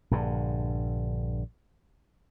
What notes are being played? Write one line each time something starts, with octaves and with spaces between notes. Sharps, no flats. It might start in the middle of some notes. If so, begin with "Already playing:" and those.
A#1 G2 D3